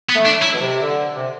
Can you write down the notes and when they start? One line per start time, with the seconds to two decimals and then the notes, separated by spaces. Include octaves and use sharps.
0.10 B3
0.15 A3
0.26 D4
0.37 F#3
0.43 E4
0.54 B2
0.60 C3
0.82 D3
1.16 C3